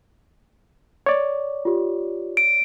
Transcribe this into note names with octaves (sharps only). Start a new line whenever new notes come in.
C#5 D5
F4 G4
D7